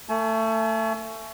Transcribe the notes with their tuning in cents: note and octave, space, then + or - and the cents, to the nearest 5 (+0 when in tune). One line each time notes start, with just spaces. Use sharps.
A3 +25 G#5 +45